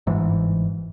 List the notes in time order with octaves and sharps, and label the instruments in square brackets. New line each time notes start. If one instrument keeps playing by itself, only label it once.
[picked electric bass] G1 G#2 E3